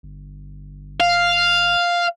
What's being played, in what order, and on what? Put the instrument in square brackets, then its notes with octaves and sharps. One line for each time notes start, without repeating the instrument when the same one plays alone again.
[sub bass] G1
[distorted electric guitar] F5